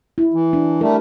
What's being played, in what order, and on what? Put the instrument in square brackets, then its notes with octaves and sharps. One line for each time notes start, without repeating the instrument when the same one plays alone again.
[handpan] E4
[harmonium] E3
[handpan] D4
[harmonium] G3 A3 [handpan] A#4